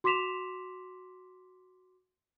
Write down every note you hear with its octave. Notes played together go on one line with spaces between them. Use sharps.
F#4 C6 D6 B6 E7 F7